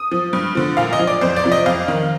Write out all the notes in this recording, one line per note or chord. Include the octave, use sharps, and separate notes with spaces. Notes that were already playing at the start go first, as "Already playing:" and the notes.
Already playing: D#6
F3
G2
D3 F3
A#2 F5
D#5
F3
D5
F2 C5
D5
C3 F3
D#5
F2 F5
D#3